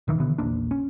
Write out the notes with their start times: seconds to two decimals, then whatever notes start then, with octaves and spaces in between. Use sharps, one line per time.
0.08 D#1 D#3 E3
0.20 B2 D3 E3 B3
0.38 A#1 E2 A#3 D4
0.71 C#4